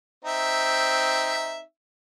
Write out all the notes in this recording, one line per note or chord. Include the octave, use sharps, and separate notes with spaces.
C4 D#4 E5